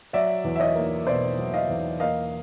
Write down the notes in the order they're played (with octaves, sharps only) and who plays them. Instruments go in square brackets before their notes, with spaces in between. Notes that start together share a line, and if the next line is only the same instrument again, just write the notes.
[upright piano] F#3 D5 E5
E2
E5
C#5 D#5
A#3
B2 C5 D5
F#3
D#5 F5
E2
A#3 D#5 F5